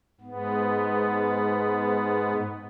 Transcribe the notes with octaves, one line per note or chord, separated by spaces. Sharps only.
G#2 B3